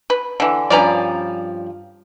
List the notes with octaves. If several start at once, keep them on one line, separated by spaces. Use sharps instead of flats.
B4
D3 E3
G2 F3 C#4 B4 D5 A#5